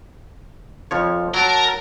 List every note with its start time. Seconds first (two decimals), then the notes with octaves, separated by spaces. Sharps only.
0.91 F2 F3 C#5
1.34 F#3 A#4 A5